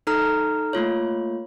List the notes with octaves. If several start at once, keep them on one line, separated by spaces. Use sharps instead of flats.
D#4 A4 A#5 F6
A3 A#3 F4 C#5